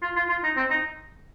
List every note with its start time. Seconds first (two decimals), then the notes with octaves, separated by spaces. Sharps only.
0.02 F4
0.16 F4
0.29 F4
0.44 D#4
0.57 C4
0.71 D#4